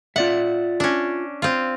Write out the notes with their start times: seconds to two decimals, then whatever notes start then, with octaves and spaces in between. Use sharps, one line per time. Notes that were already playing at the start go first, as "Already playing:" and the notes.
0.16 F4 D5 E5 F#5
0.80 C#4 D4
1.42 C4 F4